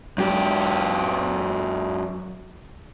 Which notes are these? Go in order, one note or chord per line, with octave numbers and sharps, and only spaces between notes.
F#2 G4